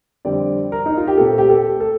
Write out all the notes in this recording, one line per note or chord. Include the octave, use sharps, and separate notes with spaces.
F2 D3 G3 C4 D5
A#4
D#4
F4
G4
A#2 A3 C4 A4
G4
A4
A4